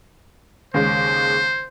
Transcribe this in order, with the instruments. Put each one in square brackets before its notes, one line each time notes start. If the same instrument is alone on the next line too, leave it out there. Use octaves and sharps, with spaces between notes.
[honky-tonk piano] D#2 C#3 G#3 [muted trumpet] C5